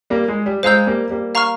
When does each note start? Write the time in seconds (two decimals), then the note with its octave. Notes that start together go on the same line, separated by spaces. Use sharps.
0.10 G3 A#3
0.28 G#3
0.46 G3
0.63 G#3 C5 F5 A#5 E6 G6
0.87 G3 A#3
1.10 G3 A#3
1.35 F5 A#5 C#6 F6